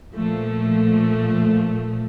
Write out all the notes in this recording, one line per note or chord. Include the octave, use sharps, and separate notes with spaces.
A#2 F3 A3